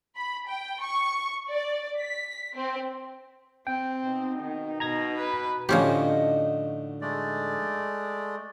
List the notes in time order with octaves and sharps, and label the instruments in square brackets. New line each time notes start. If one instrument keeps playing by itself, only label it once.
[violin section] B5
G5
C#6
D5
B6
C4
[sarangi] C4 [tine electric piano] G5
[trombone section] B2 D#4
[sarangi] D#3
[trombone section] B2 [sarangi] D#4 [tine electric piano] A#5 G#6 A#6
[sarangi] B4
[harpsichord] A2 D3 [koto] F3 C#4 G4 [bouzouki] D#4 F#4 D#5
[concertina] G#3 A3 D5